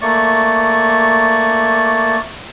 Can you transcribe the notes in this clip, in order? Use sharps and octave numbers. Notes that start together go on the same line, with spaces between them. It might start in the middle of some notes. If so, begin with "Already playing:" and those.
A3 A#3 D5 C#6